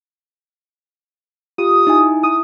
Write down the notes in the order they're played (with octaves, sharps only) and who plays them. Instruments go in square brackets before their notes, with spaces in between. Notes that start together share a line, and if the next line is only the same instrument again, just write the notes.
[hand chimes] F4 G4 [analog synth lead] D#6
[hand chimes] D#4 E4 G#5
[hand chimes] E4 [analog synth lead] D#6